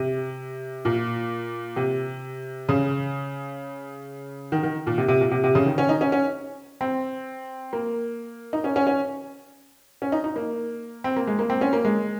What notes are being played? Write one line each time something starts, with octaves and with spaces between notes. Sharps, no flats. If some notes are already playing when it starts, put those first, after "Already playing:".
Already playing: C3
A#2
C3
C#3
D#3
D#3
A#2
C3
C3
A#2
C3
C3
C#3
D#3
C#4
D#4
C#4
C#4
C4
A#3
D#4
C#4
C#4
C#4
C#4
D#4
D#4
A#3
C4
A#3
G#3
A#3
C4
C#4
A#3
G#3